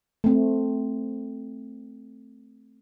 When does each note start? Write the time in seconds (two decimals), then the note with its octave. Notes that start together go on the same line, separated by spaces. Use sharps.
0.24 A3 C4